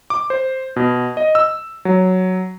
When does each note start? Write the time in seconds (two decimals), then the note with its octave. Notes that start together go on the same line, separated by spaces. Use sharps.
0.10 D6
0.30 C5
0.76 B2
1.17 D#5
1.35 E6
1.85 F#3